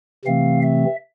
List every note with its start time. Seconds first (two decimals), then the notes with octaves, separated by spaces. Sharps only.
0.24 C3 E3 A3 C4 F5
0.62 E5